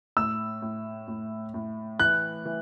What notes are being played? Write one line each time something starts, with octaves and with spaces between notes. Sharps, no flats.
A2 E6
A2
A2
A2
E3 F#6
E3